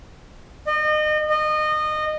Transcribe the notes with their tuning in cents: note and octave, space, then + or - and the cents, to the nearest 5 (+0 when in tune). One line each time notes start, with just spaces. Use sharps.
D#5 -35
D#5 -25